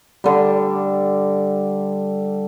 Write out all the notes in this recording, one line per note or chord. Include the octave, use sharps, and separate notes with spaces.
D3 G3